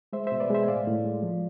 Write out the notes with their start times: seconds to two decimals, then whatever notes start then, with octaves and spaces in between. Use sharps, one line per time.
0.13 G#3 C5 E5
0.27 B2 C5 E5
0.40 B4 D5
0.50 G#3 C5 E5
0.63 G#5
0.68 A2 D5 F5
0.87 A2
1.05 G#3
1.23 F3